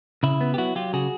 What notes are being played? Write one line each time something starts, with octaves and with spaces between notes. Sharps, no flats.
C#3 E4
B3
G4
F#3 E4 F#4
F#3 F4 G4
C#3 F#4 G#4